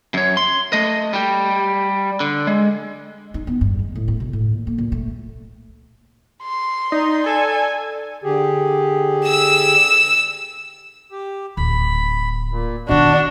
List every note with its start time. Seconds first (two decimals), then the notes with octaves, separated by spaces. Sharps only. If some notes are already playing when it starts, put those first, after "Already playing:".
0.14 F#2 C#5
0.37 C6
0.73 A3 D#5
1.13 G3 G4
2.20 D3
2.47 G#3
3.34 D#4
3.47 B3
3.61 G2
3.79 G#3
3.95 A2
4.08 A3
4.20 B2
4.33 A2
4.53 A#2
4.67 A#3
4.78 A#2
4.92 A3
6.43 C6
6.92 D#4 D5
7.26 A4 G#5
8.24 D3 G4 G#4
9.25 E6 E7
11.12 G4
11.57 D1 B5
12.51 A#2
12.88 B2 D#3 D4 F#4